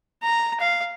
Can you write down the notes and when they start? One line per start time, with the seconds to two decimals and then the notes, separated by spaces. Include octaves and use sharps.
0.23 A#5
0.60 F5